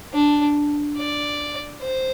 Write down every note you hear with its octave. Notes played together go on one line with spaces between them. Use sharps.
D4
D5
C5